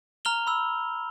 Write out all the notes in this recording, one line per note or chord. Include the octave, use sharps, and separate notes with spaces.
A#5 F6 F7 G7
B5 E6